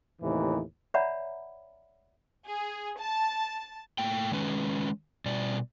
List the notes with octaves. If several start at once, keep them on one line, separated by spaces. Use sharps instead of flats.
D#2 A2 C3 D#3 E3
C#5 D5 E5 F#5 A#5 B5
G#4
A5
A2 A3 A#3 G5
D#3 G#3 C#4 B4
B2 G3 D5